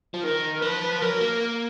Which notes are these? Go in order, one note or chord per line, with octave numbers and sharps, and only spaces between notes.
F3
D#3 A#4
F3 B4
F#3 A#4
A#3